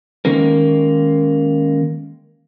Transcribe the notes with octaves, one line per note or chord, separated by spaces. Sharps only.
D#3 G#3 A#3 C#4 A#4